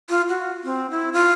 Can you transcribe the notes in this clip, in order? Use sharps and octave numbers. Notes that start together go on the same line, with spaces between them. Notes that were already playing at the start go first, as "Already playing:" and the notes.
F4
F#4
C4
E4
F4